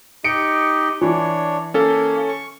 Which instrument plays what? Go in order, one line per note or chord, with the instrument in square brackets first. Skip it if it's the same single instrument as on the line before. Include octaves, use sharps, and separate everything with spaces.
[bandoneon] D#4 G4 D#5 [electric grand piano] C#7 D7
[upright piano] E3 [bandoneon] D4 C#5
[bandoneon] A#3 [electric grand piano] C#4 A4 C#5
[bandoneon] C#6